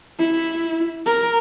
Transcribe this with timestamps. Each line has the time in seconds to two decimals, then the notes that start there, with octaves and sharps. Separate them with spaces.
0.19 E4
1.06 A#4